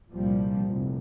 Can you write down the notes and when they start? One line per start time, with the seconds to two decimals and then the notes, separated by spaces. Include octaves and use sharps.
0.13 C2 A#2 F3 G3
0.67 F1 C2